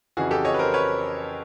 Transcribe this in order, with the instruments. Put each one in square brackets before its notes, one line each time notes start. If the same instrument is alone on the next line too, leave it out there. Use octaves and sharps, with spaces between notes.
[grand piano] F2 C#3 E3 F#4 G#4
G4 A4
C#5 D#5
B4
A#4 C5
B4 C#5